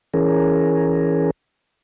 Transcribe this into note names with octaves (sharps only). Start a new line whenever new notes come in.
E3 C#4 G#4 A#4